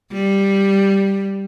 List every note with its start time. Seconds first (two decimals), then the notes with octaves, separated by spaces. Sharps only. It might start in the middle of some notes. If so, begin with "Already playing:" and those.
0.12 G3